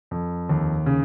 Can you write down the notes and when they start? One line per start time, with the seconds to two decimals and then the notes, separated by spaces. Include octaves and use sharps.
0.11 F2
0.49 D#2
0.86 C#3